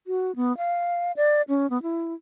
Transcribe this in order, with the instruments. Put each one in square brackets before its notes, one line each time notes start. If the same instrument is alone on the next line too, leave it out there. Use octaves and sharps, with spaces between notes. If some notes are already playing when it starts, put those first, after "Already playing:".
[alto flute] F#4
B3
F5
D5
C#4
B3
E4